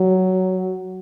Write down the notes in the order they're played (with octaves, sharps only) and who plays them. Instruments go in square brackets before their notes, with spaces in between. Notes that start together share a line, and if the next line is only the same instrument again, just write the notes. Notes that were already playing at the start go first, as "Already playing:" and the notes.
Already playing: [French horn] F#3